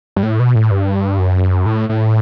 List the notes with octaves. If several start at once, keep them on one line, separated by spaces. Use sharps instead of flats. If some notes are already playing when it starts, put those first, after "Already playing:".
G2
A2
B2
A2
G2
F#2
A2
A2